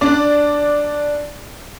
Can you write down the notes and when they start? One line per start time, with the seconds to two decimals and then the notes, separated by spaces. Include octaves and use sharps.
0.01 D4 D5